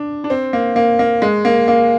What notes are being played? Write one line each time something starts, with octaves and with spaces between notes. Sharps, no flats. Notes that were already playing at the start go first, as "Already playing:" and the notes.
Already playing: D4
D4
C4
A#3
A#3
A#3
G#3
A#3
A#3